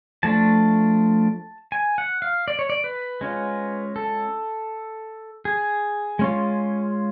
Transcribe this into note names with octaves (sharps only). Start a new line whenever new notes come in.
F3 A3 D4 A5
G#5
F#5
F5
D5
C#5
D5
B4
G#3 C#4 F4
A4
G#4
G#3 C#4 F4